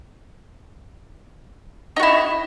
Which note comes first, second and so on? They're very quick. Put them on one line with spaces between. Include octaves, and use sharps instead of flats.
D#4 F#4 E4